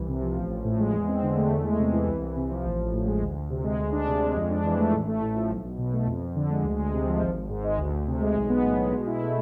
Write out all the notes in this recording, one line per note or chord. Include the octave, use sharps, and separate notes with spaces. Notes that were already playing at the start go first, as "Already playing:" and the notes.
Already playing: C2 E3
C3
F3
A1
A1
A2
G#3
E2
C4
D3
A3
E2
G#3
C3
E3
C2
C2
C3
F3
A1
A1
A2
G#3
D2
D2
C3
G#3
D2
D4
C3
G#3
F2
D4
E3
A3
A1
A3
A2
F3
B1
B1
B2
A3
F2
F2
D3
G#3
D2
G#3
C3
F3
G#1
G#1
G#2
G#3
D2
D2
C3
G#3
B1
B3
A2
G#3
B2
E4
A3